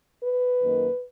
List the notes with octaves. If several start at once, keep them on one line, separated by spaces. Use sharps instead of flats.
B4
F#2 D#3 A#3